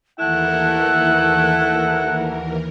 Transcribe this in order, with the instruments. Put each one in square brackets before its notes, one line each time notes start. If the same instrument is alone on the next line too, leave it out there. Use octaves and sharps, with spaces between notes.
[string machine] D#2 E3 A#4 [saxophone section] A3 E4 [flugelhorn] F#5 [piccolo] F#6